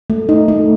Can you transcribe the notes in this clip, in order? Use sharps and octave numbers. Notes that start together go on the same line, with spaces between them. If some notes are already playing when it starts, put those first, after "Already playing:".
A3
D#4
A3